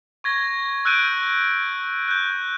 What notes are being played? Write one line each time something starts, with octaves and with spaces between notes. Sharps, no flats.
C#6 G#6 A#6
E6 F#6 G6 D7 D#7
F#6 G6